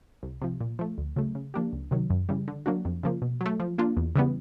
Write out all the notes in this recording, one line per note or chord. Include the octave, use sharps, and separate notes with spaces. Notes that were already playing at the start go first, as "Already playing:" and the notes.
C2
C3 F3
A#2
F3 A3
D2
C#3 F#3 A3
C#3
F3 A#3 D4 G4
C#2
C3 D#3 F#3
F#2
C#3 E3 G3
D3
F#3 A#3 D4 F#4
F2
C#3 F3 A#3
B2
F#3 A3
F3
A#3 D4 F4
E2
C#3 E3 G3 B3